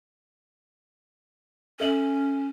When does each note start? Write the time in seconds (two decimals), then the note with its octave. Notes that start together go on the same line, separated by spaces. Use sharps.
1.80 C#4 A4 E5 F#7